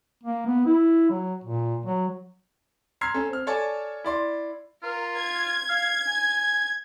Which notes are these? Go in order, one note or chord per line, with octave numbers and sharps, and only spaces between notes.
A#3
B3
E4
F#3
A#2
F#3
A#5 C6 E6 F6 G#6 C7
C#4 A4
C4 F6
A4 C#5 D5 G#5 A5
E4 D5 C6
F4 A#4
G#6
F5
G#5